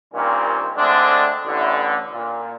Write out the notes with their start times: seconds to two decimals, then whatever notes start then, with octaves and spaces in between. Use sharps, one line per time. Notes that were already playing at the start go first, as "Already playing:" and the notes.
0.14 G2 A#2 D#3 A#3 C4 C#4
0.77 D3 G#3 A3 C4 D4
1.45 A1 D3
2.13 A#2